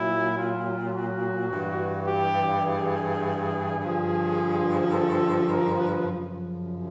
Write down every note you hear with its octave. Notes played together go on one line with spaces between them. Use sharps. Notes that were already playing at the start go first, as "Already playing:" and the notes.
Already playing: A#2 F#3 E4
F4
F#4
G2 E3
G4
G#4
G2 D3 F3
A4
A#4
B4
F#2 C#3 F3